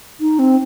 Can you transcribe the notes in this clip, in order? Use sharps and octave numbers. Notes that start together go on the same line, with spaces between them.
D#4
C4